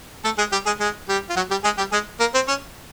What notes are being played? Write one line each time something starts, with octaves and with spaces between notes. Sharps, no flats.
A3 A4
G#3 G#4
G3 G4
G#3 G#4
G#3 G#4
G3 G4
F4
F#3 F#4
G3 G4
G#3 G#4
G3 G4
G#3 G#4
A#3 A#4
C4 C5
C#4 C#5